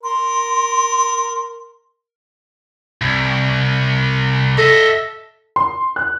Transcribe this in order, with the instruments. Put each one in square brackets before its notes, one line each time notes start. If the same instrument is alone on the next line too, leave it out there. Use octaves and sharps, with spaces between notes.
[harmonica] A#4 [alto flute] C6
[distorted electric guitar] C2
[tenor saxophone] A4 [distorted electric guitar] D#5 E5
[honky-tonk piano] C6
F#6